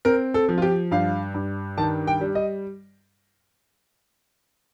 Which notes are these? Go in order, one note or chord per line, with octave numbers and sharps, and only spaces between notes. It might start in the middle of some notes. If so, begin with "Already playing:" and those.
C4 A#4
A4
F3
F4
G4
G2 F5
G2
D#3 A5
G5
G3
D#5